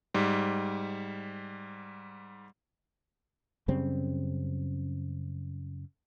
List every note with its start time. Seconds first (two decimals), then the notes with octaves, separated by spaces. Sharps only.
0.14 G#2 G3
3.68 F#2 C#3 G3 C4